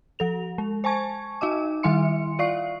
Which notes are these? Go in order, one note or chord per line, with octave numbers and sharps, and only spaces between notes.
F3 A4 F7
G#3
C5 G#5 A5 C#6 G#6
D#4 F#4 D#5 D6
D#3 G3 E4 E5 C6 C#7
F4 D5 F5 C#6 C7